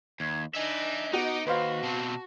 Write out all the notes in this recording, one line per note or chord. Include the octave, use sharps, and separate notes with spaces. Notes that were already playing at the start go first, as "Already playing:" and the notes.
D#2 G#6
D4 D#4 D#5 E5 G#5
B3 D#4 F#4 D6
D#2 F#4 B4 C5 F5
B2 C4 A5